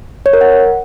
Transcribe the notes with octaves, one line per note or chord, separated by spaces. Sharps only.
C#5
A#4
F#5